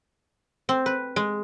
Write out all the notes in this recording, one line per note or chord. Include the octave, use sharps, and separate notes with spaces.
C4
B4
G#3